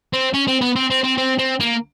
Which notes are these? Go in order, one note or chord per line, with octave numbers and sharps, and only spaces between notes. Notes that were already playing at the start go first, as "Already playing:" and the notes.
C4
C#4
C4
B3
C4
C4
C4
C4
C4
A#3